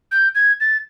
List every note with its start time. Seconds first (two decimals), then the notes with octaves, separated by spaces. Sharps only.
0.11 G6
0.35 G#6
0.60 A6